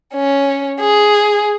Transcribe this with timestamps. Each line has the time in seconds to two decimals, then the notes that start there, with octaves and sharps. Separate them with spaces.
0.14 C#4
0.80 G#4